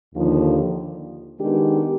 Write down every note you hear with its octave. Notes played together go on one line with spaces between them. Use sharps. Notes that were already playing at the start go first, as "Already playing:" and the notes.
D#2 D3 F3
D#3 G#3 B3 D4 G4